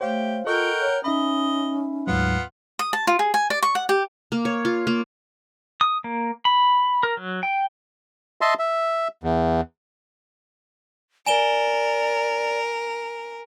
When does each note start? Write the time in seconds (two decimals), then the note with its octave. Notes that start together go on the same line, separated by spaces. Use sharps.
0.01 A3 G4 C5 C#5 F5
0.47 F4 A4 A#4 D#5 F#5 G5 C#6
0.81 C#5
1.04 C#4 D#4 D#5 E5 B5
2.07 D2 G#2 F#3 B3 F4 F#5
2.79 D#6
2.93 A5
3.07 F4
3.19 G#4
3.34 G#5
3.50 D5
3.63 C#6
3.75 F#5
3.89 G4
4.32 A#3
4.45 C#5
4.65 F4
4.87 A#3
5.81 D#6
6.04 A#3
6.45 B5
7.03 A#4
7.17 F#3
7.43 G5
8.41 D#5 E5 A5 C6
8.59 E5
9.24 E2
11.26 A#4 D5 G#5 E7 G7